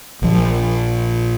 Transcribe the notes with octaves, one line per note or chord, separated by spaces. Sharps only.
A#1 F3